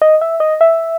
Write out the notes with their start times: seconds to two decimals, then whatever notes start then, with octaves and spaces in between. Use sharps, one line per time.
0.02 D#5
0.21 E5
0.40 D#5
0.61 E5